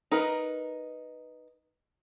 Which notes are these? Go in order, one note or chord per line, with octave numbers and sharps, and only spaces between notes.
D#4 A#4 B4